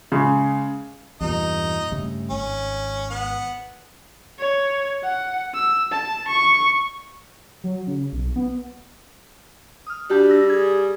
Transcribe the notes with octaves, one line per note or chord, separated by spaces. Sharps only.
C#3 G#3
E2 G2 A#2 D#4 D#5
G2 C#3 A3
G#1 C#4
B3 F#5
C#5
F#5
E6
A5
C#6
F#3
C#3
B1
B3
D#6 F6
G3 D4 F#4 G4 A5
E6 A#6
G#4 G#6